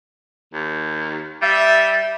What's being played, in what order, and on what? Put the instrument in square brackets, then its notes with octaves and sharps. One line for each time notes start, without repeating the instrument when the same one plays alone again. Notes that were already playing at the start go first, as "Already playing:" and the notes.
[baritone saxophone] D#2
[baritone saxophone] G3 [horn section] E5